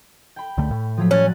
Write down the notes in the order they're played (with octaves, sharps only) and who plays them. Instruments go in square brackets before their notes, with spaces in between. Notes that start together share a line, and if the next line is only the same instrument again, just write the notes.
[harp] G5 B5
[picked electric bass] C#2 D3 A3
A2
[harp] F3 F#3 B6
[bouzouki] C#4 [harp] F#6 A6